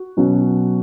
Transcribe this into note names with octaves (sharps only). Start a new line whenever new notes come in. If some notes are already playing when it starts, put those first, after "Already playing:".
Already playing: F#4
B2 F#3 C#4